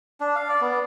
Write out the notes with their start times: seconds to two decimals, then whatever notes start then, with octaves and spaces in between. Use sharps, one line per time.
0.20 D4
0.36 F5
0.49 D5
0.61 B3